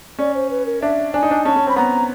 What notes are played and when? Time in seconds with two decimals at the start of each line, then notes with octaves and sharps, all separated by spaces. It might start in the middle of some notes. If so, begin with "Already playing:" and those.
0.19 C#4 D5
0.35 C5
0.51 B4
0.66 A#4
0.82 D4 E5
1.14 D4 G#5
1.23 D#4
1.31 D4
1.45 C#4 A5
1.56 C#4
1.67 C4 B5
1.76 B3 A#5